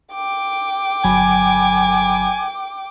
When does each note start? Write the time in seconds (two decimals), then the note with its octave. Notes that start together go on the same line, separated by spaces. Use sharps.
0.14 G5 D6
1.04 G1 F#3 G#5 B5